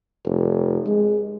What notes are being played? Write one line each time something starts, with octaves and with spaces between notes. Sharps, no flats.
F1
G#3